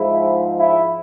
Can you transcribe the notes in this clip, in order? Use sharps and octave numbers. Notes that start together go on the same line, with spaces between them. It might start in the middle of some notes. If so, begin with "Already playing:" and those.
Already playing: G#2 F3 G#3 E4
E4